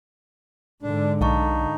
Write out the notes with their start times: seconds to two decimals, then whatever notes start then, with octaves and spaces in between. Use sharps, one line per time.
0.82 G#2 D3 D4
1.21 B1 D#4 F5 A5 C#6